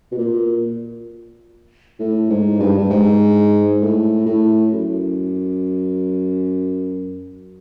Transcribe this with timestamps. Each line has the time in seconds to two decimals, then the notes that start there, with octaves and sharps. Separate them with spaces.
0.12 B2
0.18 A#2
2.00 A2
2.30 G#2
2.60 G2
2.78 G2
2.90 G#2
3.82 A2
4.26 A2
4.72 F#2